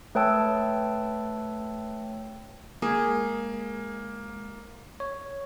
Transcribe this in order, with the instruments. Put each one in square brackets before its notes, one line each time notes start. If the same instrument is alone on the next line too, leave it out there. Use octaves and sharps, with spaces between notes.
[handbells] A3 B4 C#5 G5 A5 E6
[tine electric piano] G#3 [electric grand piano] A#3 [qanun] G#4
[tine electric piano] C#5